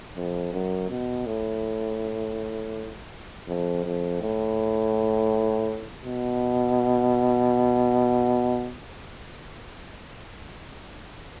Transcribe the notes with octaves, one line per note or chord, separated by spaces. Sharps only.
F2
F#2
B2
A2
F2
F2
A2
B2